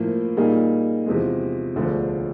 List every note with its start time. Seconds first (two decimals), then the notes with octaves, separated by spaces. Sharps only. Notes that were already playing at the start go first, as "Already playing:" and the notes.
Already playing: A2 F3 A#3
0.37 A#2 G3 A#3 D#4 G#4
1.06 E2 C3 F3 G#3
1.74 E1 D2 D3 F3